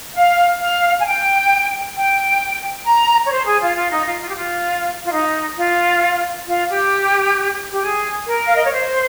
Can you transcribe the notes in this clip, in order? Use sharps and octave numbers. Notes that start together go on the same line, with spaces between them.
F5
F5
G#5
G5
G5
A#5
C#5
C5
G#4
F4
F4
D#4
F4
F4
G4
F4
F4
D#4
F4
F4
G4
G4
G#4
A#4
F5
D#5
C#5
C5